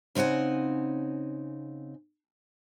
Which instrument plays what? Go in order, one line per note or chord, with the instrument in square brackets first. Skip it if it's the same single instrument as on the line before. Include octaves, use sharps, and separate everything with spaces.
[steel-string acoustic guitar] C#3 C4 D#4 F#5 G#5